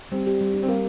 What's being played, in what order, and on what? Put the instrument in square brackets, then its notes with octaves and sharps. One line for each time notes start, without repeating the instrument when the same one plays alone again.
[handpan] G3 [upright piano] C4
[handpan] G4
G3
D4
[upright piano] C4
[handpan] G3 [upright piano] A#3